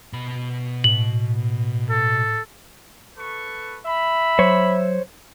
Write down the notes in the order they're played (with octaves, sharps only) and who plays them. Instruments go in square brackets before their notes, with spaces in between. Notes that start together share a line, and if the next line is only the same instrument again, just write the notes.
[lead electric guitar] B2 B5
[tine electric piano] A2 [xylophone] F#7
[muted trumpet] A4
[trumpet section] A4 B4 C#6
[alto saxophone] E5 [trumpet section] B5
[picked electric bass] F#3 [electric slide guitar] C5 C#5